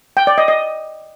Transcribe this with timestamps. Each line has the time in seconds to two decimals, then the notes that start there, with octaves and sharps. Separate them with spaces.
0.17 G5
0.27 D5
0.38 D#5
0.48 D#5